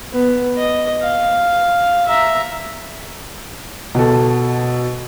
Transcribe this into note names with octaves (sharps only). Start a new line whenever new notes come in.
B3
D#5
F5
E5 A#5
B2 A4